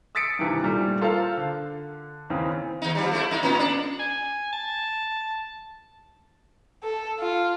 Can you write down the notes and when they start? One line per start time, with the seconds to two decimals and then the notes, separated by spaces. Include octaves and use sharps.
0.15 D#6 E6 A6 B6 C#7 D7
0.39 G2 C3 D#3 E3
0.63 A#2 G3 A3
1.01 F4 A4 A#4 C5 F5
1.37 D3
2.30 D#2 C#3 E3 C4
2.82 D#2 D#4
2.95 F3 G3
3.11 A3 E4
3.31 A2 D#4
3.43 A2 B3 C#4
3.59 D4
4.00 G#5
4.53 A5
6.84 A4
7.20 F4